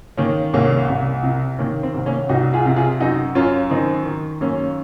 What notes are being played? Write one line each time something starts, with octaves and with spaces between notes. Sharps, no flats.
D#3 A#3 C#4
C2 A#3 C#4
C2
C3
D#3 A#3 C#4
C4
C2
A#3 C#4
C2 D#4 F#4
F4 G#4
C3
F4 G#4
F#2 D#4 F#4
F#2 C#4 F4
D#3 C4 D#4
D#3
F#2 A#3 C#4